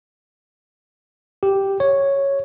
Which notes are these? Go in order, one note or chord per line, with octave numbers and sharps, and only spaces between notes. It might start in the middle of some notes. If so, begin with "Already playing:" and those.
G4
C#5